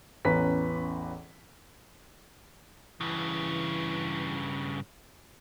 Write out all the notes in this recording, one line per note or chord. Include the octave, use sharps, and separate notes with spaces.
A1 E2 C#4 B4 A#5 B6
G2 C#3 E3